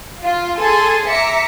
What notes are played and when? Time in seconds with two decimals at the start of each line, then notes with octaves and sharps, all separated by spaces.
0.22 F4
0.58 G#4 A4 G#5 C6 A6
1.07 E5 A#5 D6 B6 C#7